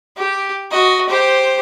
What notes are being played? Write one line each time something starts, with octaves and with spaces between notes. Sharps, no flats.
G4
F#4 D#5
G4 C5